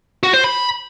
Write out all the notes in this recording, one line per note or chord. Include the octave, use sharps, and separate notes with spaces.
F#4
C5
B5